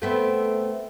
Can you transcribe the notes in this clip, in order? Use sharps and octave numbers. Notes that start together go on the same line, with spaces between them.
A3 B3 C4